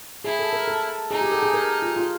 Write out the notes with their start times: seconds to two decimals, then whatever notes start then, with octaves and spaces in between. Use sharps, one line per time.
0.24 E4 G#4
0.39 A4
0.53 A#4
0.68 A4
1.11 D#4 G#4
1.21 G4
1.32 A4
1.43 G#4
1.54 A#4
1.82 F4
1.96 F4